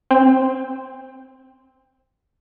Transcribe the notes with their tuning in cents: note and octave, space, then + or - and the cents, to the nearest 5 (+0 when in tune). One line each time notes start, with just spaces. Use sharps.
C4 +0 G5 +30